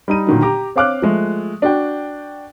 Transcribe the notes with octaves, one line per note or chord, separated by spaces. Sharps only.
G3 D#4 D#7
A#2 D3 D#3 F#3
G4 A#5 D6
C4 C#5 F5 D6 F6 F#6
F3 G#3 A3
D4 F#4 G5